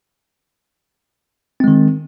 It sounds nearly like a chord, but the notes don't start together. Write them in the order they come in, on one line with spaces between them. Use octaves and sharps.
C4 G#3 D#3